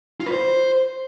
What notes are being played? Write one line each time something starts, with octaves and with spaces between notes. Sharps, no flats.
F4
B4
C5